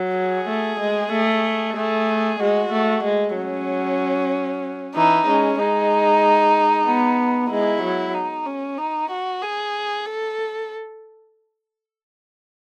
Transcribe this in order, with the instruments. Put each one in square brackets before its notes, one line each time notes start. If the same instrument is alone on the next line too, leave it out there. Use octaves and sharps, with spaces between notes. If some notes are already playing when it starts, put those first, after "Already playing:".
Already playing: [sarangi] F#3
[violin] G#4
[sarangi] A3
G#3
A3
[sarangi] A3 [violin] G#4
[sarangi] G#3 [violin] F#4
[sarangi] A3
G#3
[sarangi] F#3 [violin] C#4
[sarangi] E3 [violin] D#4
[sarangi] G#3 [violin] C#4
[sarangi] G#3 [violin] D#4
[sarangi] B3
[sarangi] G#3 [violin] E4
[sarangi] F#3
[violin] D#4
C#4
D#4
F#4
G#4
A4